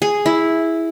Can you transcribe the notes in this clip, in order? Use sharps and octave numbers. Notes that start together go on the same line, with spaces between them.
G#4
E4